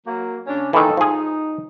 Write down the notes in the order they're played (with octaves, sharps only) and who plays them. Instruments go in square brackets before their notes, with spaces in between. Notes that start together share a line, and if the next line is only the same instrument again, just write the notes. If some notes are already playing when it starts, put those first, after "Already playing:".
[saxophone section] F#3 A#3
C#3 C#4 D4
[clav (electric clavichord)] D#3 E3 [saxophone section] A#3 D#4 A4
[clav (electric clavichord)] F3 G#4 [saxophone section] D#4